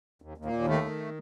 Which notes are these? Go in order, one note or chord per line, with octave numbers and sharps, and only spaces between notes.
D#2
D#2
A#2 A#3
D#2
D#3 A3
D#3